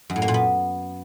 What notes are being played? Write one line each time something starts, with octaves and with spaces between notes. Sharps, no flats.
F#2
A2
A#3
A#2
B3